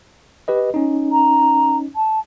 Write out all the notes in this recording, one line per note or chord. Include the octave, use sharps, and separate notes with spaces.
G4 B4 D#5
C#4 D#4
A#5
A5